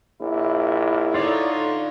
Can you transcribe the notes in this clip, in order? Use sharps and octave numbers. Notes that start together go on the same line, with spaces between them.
A#1 E4
D3 D#4 F4 C#5 D5